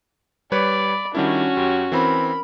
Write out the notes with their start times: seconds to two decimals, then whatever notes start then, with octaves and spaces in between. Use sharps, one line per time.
0.52 G3 B4 C#5 D5 B5
1.15 D#3 G3 C#4 D4 E4 F#4
1.57 F#2 G4
1.92 E3 C4 A#4 B5